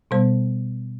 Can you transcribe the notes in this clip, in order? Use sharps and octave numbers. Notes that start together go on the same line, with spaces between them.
B2 G3 B3 C5